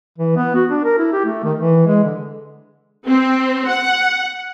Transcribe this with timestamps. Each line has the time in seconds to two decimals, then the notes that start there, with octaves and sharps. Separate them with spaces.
0.18 E3
0.36 B3
0.55 F#4
0.70 D4
0.84 A#4
0.99 E4
1.13 G4
1.25 A3
1.44 D#3
1.58 E3
1.87 G#3
2.04 D3
3.06 C4
3.67 F#5